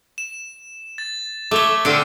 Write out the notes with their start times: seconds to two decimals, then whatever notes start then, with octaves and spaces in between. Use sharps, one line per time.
0.18 E7
0.98 A6
1.51 A3 C#5 E5 D6 G7
1.85 D3 C4 D4 F6 C#7